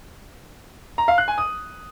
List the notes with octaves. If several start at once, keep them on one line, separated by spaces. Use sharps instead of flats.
A#5
F5
F#6
G#5
D#6